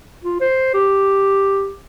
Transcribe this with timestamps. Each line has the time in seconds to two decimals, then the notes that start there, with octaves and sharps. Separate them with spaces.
0.24 F4
0.41 C5
0.74 G4